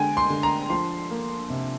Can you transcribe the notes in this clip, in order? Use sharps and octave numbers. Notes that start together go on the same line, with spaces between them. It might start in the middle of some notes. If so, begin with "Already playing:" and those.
Already playing: D3 G#3 G5 G#5
C6
D3
A#5
F3 C6
A#3
C3